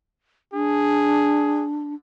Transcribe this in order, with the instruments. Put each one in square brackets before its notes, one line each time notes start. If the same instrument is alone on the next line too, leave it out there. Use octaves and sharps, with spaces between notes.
[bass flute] D4 [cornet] G#4